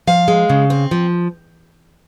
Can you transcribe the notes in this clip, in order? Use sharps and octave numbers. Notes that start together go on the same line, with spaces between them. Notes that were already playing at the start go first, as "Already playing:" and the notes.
F3 F5
G#3
C#3
C4
F3